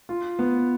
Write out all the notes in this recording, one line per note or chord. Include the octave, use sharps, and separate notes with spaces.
F4
B3